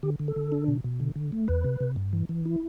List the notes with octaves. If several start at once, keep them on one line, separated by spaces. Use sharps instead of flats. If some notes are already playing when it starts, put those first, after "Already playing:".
D3 G4
D3
A4
D3
D4
B2
B2
D3
D3
A3
E2 B4
C3
C3
G2
E3
E3
E4